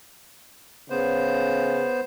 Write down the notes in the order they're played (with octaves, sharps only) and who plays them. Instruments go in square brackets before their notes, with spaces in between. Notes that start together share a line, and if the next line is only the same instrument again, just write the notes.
[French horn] C#3 [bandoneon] B3 C5